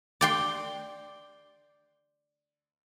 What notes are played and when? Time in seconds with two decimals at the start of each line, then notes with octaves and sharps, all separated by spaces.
0.21 D5 G5 C6